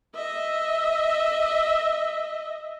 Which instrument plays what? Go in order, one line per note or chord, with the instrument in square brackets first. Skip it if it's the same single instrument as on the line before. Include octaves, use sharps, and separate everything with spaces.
[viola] D#5 E5